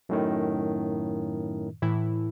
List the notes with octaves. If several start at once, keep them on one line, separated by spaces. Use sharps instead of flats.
F#2 A2 D#3
A2 E3 E4